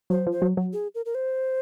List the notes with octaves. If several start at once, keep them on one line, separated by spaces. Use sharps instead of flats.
F#3 C5
F3
C5
F#3
F#3
G#4
A#4
A#4
C5